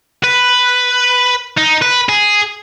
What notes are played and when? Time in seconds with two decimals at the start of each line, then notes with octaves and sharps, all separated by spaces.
0.24 B4
1.58 D#4
1.82 B4
2.09 G#4